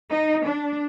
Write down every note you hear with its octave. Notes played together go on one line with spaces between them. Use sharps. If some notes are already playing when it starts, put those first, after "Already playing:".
D#4
D4